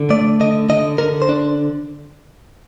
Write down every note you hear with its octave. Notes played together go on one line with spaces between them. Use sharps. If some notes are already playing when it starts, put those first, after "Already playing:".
Already playing: D3
A3 D5
D3 D#5
D3 D#5
D3 A#4
C5
D4